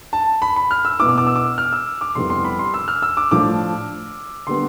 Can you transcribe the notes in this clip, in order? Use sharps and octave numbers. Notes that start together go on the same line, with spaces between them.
A5
B5
B5
F6
E6
B2 B3 E4 D6
E6
D6
E6
D6
F6
E6
D6
F2 C3 G3 B3 E4 C6
C6
B5
C6
E6
F6
E6
D6
A2 F3 A3 D4 D6
D3 G3 B3 C6